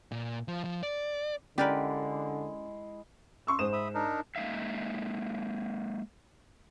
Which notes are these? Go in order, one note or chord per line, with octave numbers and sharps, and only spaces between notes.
A#2
F3
F3
D5
D3 G#3 C#4 E4 G4 A#4 B4 D5
C6 C#6 E6
G#2 C5 D#6 E7
E5 B5 D#6
D4 D#4 A#4
G#3 A#3 D#4 E5 F5